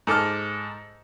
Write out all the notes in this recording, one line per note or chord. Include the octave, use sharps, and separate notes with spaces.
G#2 A4 D6 F6